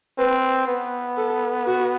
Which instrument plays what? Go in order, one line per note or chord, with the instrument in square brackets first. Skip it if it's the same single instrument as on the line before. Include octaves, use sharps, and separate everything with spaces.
[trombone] C4 [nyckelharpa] B4
[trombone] B3 [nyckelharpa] B4
[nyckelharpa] A4
F#4